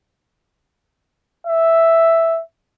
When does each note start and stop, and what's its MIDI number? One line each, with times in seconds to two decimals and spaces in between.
1.47 2.41 76